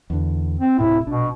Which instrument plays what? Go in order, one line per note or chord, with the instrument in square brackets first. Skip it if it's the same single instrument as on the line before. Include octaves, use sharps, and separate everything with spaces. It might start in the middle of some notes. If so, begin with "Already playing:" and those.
[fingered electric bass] E2 D3
[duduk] C4
[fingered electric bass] D1 A2 C3 [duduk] E4
[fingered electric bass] A#1 D4 [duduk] B2